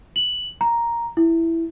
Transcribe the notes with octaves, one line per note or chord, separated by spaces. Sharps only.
F#7
A#5
E4